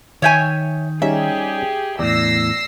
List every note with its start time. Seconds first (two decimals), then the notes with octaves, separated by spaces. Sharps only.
0.22 D#3 C#5 E5 G5 G#5
1.02 G3 C#4 D#4 G4 G#4 E5
1.99 E2 A2 D5 E6 A#6 C7